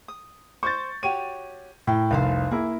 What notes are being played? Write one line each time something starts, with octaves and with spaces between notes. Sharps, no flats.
D#6
C5 C#6 G6 A6
F#4 G4 C#5 D#7
A2 A#4 G5
F1 C2 C5 F5 A5
A#3 E4 G#4